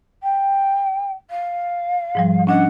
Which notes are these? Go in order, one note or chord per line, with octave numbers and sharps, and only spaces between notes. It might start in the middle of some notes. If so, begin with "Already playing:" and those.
G5
F5
G#2 F3 G3
C#4 D4 D#5 F#5